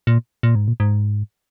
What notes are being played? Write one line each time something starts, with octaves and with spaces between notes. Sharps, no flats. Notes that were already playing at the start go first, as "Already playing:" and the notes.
A#2
A#2
G#2
A#2
G#2